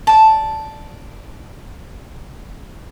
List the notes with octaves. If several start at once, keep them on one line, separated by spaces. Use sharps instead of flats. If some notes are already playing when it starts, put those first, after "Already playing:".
D5 A5